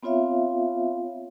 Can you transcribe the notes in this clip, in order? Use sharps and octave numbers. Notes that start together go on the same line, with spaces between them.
B3 C4 F4 C#5 E5 F5